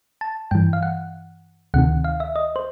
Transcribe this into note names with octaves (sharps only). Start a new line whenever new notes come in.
A5
G2 E3 G5
F5
F#5
D2 C3 D#3 F#5
F5
E5
D#5
C5